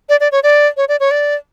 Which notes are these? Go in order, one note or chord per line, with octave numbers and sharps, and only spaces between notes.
D5
D5
C#5
D5
C#5
D5
C#5
D5